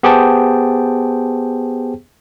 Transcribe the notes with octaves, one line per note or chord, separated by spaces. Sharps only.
B3 G4 G#4 C5 G5 A5